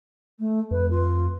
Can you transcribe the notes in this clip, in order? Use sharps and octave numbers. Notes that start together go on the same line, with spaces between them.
A3
F2 B4
F4